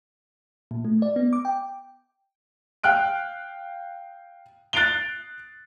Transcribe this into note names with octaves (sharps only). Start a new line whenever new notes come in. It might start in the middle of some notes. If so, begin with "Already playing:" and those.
A#2
A3
D5
B3
D6
G5
F5 G5 F6 F#6 D7
F#6 A6 C7 D7 F7 G7